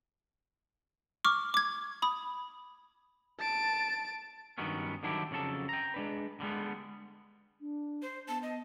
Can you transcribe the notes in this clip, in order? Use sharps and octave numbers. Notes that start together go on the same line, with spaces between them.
C#6 D6 F6
D6 G#6
B5 D#6
A5 D7
G2 D#3 F#3 B3 C#4
D3 D#3 F#3 D4 E4 G4
F2 C#3 F#3 A4 A5
G5 A#5
G#3 D4 B4
D3 G3 G#3 B3
D4
C5
B3 A5
D#5